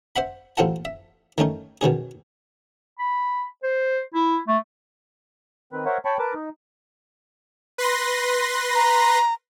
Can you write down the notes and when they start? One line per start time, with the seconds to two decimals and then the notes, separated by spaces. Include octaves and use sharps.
0.16 C5 E5 F#5 B5
0.57 A1 C4 F4 A4 F#5 A5
0.85 E5
1.38 D#3 A3 C#4 D#4
1.81 B2 D#3 C#4 G#4
2.99 B5
3.63 C5
4.14 E4
4.48 A3
5.73 D#3 C4 B4
5.86 A#4 C5 C#5 E5 F#5
6.05 C#5 G5 A5 B5 C#6
6.19 A#4 B4 A5 D6
6.34 D#4
7.78 B4 C6 A#6
8.75 A#5